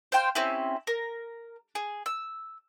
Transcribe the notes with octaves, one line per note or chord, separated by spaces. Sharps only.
C5 F5 G5 C6
C4 C#4 E4 G4
A#4
G#4
E6